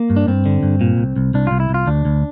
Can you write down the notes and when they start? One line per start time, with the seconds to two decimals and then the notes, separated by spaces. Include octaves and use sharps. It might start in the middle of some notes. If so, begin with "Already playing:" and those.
Already playing: A#3
0.10 G2
0.16 D4
0.27 G2 C4
0.46 D3
0.63 G2
0.81 A#2
0.98 C2
1.16 C2
1.34 C2 D4
1.47 C2 F4
1.60 E4
1.69 C2
1.74 F4
1.86 D2 D4
2.05 D2